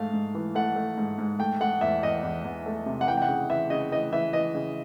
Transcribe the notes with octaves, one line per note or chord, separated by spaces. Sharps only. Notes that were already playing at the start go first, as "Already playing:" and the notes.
Already playing: G#2 A3 F5
G#2
E3
A3 F#5
A3
G#2
G#2
A3 G5
A3 F#5
E2 E5
E2 D#5
E2
E2
A3
C3
F#5
E3 G5
G5
F#5
C#3
E3 E5
C#3 D#5
E3 D#5
E3 E5
E3 D#5
C#3